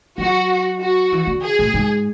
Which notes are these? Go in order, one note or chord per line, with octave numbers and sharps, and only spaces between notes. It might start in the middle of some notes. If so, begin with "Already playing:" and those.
F#3 F#4
F#4
E3
D3
G#4
A2
G#2